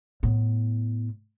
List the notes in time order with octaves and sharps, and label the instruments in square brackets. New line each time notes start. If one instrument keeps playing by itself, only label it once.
[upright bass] A2 B3